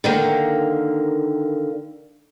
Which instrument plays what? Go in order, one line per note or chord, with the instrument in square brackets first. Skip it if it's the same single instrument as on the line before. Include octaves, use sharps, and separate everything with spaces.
[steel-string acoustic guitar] D3 D#3 A#3